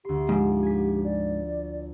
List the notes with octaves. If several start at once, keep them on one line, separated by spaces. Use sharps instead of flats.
D2 G4 C6
G#2 F3
G#5 B6
D5